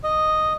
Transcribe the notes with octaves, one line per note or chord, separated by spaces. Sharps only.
D#5